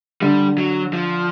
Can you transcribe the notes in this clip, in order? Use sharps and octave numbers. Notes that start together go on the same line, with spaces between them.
D3 G3
F#3
F3